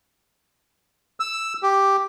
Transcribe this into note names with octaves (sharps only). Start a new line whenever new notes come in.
E6
G4